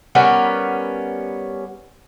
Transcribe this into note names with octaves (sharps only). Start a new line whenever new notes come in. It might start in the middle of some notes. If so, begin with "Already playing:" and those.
G3 B3 C#4 A#4